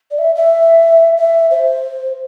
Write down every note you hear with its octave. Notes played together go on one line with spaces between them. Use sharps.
D5
E5
E5
E5
C5